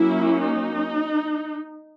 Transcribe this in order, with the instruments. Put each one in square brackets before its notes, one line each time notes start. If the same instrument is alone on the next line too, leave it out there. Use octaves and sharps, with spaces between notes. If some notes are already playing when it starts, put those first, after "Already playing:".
Already playing: [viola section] F#3 A#3 C#4 E4
D#4